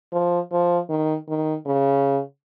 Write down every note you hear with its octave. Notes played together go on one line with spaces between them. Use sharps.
F3
F3
D#3
D#3
C#3